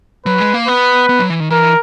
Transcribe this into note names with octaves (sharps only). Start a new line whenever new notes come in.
F#3 B4
G#3
A#3
B3 B4
B3
F#3
E3
D#3
E3 A#4